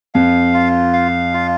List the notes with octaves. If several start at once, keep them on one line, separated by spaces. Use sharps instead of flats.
F2 F5
F4
F5
F4